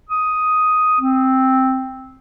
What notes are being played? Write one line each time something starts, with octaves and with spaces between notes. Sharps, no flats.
D#6
C4